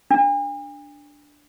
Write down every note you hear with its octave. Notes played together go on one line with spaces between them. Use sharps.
D4